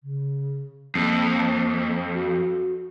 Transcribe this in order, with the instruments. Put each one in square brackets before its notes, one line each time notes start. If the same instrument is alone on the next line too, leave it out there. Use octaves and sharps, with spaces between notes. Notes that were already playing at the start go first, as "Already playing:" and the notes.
[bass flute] C#3
[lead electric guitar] F2 [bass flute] A#3
[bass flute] F#4